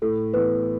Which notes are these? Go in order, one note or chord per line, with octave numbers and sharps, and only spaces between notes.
A2 A4
E3 B3 B4